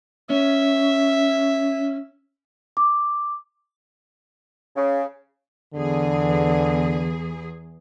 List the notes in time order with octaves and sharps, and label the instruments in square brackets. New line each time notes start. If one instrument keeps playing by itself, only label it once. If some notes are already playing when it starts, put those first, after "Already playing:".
[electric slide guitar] C#4 [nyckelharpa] E5
[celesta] D6
[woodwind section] C#3
[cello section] E2 G#4 [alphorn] D3